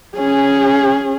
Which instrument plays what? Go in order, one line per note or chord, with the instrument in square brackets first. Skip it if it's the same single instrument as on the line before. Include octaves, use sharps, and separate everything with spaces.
[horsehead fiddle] C#4 G#4